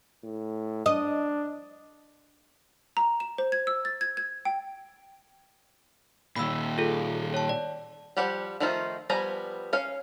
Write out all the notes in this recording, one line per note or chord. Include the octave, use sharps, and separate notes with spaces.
A2
D4 D#5
A#5
E7
C5
G#6
E6
A6
G#6
G#6
G5
A#2 D#3 B5 E6
F4 G#4 A4
C#5 A5
D5
F3 G3 G4 F#5
D#3 F3 A3 D#4 F4
F3 G3 B3 G#5 A#5
C#4 C#5 F5